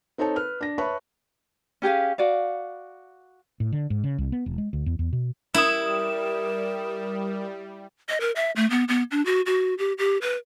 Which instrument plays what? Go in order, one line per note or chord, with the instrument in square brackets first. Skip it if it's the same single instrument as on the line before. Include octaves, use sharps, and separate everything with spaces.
[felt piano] C4 D#4 A4 C#5 A5
B4 F6
D4 A#6
B4 C#5 E5 A5 B5 C#6
[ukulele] C#4 G4 G#4 F5
F#4 D5 F5
[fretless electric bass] A2
D3
G#2
C#3
C2
B3
E1
G#3
D2
E2
E2
B2
[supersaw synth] G3 [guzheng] E4 [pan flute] A#4 [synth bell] D#6 E7
[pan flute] D#5
A#4
E5
A3
B3
B3
D4
F#4
F#4
G4
G4
B4